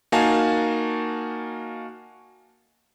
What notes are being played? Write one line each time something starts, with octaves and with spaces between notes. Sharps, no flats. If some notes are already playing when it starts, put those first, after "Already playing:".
A#3 D#4 F#4 F5 G#5 A5